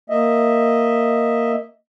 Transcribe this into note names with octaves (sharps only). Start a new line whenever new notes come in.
A#3 D#5 E5